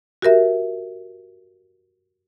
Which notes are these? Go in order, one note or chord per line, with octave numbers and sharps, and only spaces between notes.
F#4 G4 A#4 E5